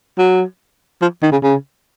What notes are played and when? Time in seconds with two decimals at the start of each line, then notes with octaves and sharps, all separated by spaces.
0.18 F#3
1.02 F3
1.22 D#3
1.32 C#3
1.43 C#3